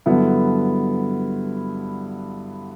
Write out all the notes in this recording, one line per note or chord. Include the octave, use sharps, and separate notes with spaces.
G2 D3 F#3 B3 E4